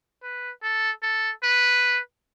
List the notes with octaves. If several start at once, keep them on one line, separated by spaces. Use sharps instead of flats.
B4
A4
A4
B4